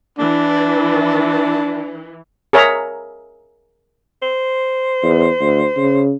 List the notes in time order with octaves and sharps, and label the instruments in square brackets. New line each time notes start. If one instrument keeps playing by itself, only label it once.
[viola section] E3 [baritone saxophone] D4
[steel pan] G#4 A#4 C#5 E5 A#5
[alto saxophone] C5
[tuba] E2
D2
C#3